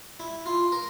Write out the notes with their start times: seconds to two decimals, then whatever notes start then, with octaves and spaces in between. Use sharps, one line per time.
0.20 E4
0.46 F4
0.72 A#4